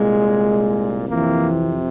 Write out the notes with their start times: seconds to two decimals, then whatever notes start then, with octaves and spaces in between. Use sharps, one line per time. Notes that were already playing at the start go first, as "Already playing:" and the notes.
Already playing: C2 A#2 G#3
1.09 F2 C3 E3 A#3